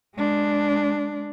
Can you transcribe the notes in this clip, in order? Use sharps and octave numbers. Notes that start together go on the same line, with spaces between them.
G#3 D4